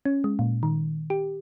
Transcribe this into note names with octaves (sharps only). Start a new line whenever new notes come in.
C#4
G#3
A#2
D#3
G4